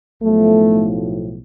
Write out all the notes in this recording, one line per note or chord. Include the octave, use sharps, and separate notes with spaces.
B1 A2 F3 A3